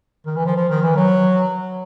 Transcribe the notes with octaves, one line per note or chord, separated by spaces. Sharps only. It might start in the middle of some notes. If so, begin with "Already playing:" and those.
D#3
E3
F3
F3
D#3
E3
F#3